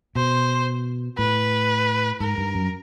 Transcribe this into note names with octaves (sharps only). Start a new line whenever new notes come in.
B2 C5
A2 B4
G#2 A#4
G2
F#2